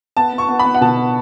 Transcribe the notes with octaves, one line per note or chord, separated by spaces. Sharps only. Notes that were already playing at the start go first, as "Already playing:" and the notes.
B3 A5
B3
C#6
B3
B5
B3
F#5
B2 A5
B3